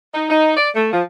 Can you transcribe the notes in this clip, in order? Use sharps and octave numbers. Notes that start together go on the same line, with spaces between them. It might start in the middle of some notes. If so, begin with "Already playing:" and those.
D#4
D#4
D5
A3
F3